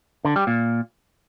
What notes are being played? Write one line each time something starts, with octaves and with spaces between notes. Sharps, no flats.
D3
G3
A#2